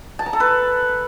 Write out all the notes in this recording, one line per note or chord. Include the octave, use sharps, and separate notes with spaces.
A5
A#5
A4
B4